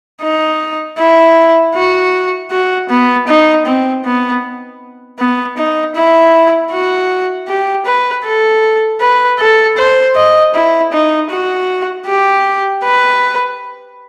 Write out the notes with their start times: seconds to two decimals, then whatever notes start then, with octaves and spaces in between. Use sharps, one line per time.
0.22 D#4
0.98 E4
1.75 F#4
2.51 F#4
2.89 B3
3.28 D#4
3.66 C4
4.04 B3
5.19 B3
5.57 D#4
5.95 E4
6.71 F#4
7.48 G4
7.86 B4
8.25 A4
9.01 B4
9.39 A4
9.77 C5
10.16 D#5
10.54 E4
10.92 D#4
11.31 F#4
12.07 G4
12.84 B4